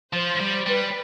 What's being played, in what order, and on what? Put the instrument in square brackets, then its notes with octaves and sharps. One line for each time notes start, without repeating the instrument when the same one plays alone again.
[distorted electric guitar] F3 [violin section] C5
[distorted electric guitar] G3
[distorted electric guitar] G3 [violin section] B4